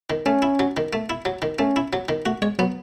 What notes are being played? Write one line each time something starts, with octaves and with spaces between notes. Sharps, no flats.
D#3
A3 C#4
E4
F#3
D#3
A3
E4
F#3
D#3
A3 C#4
E4
F#3
D#3
A3 F#4
G#3 C#5
F#3 B3